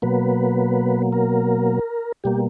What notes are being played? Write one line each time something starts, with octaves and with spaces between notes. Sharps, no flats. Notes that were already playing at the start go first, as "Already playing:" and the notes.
B2 F#3 A#3 B4
A#4
B2 G3 A#3 G4